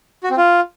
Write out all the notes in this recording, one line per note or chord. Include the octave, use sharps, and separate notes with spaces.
F#4
C4
F4